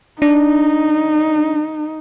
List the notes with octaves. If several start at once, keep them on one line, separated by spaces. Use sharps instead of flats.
D4 D#4